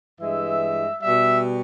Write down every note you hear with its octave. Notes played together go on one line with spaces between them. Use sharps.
G2 E3 G#3 E5
B2 G3 E5